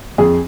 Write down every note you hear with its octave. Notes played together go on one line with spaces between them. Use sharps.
F2 G#4